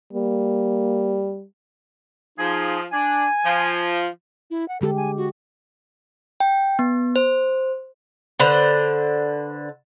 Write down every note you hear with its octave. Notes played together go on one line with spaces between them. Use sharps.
G3 A#3
F3 D#4 F4 G#4
D4 G#5
F3
E4
F#5
D3 G#3 G4 A4
G#5
F#4
G5
B3
C5
D3 B4 C5